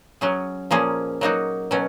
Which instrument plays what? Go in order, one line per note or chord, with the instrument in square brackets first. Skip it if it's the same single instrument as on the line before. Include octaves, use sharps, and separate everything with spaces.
[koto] F#3 C#4 G#4
A#2 F3 A#3 C#4 G#4
F#3 A#3 D#4 F#4
B2 F#3 C#4